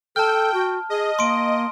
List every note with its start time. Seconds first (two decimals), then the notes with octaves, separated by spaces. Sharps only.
0.16 A4 G5 A5 F6
0.54 F#4
0.90 G#4 D#5
1.19 A#3 C6 D7